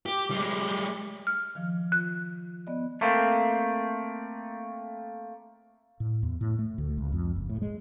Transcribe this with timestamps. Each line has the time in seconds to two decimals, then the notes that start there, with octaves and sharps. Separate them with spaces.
0.06 G4
0.31 G3 G#3
1.27 F6
1.55 D#3 F3
1.92 F4 F#6
2.67 B3 D5 D#5
3.01 A3 A#3 C4
6.00 A2
6.23 E2
6.41 A2
6.59 A3
6.78 D2
6.98 C#2
7.12 F2
7.36 F#1
7.49 A2
7.62 G#3